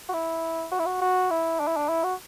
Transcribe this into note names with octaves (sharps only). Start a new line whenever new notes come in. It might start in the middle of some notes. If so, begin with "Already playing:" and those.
F#4
E4
F#4
E4
F#4
F#4
E4
D4
E4
D4
E4
F#4